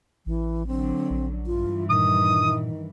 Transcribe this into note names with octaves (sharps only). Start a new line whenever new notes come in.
A1 E3
D3 F#3 C4
A#1
G2 E3 F4
A#2 D#3 D#6